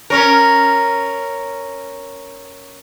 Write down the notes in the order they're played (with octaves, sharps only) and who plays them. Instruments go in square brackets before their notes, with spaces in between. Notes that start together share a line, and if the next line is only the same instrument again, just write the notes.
[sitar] C#4 A#4